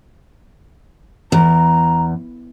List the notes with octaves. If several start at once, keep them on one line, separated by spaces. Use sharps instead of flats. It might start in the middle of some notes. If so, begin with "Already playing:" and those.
E2 A#5